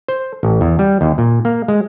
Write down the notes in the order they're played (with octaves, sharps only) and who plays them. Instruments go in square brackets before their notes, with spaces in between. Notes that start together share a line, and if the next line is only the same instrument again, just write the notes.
[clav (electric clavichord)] C5
A1
E2
G3
D#2
A#2
A#3
G#3